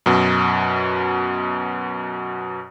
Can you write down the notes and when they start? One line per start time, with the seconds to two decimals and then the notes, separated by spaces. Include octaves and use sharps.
0.06 F#2 B2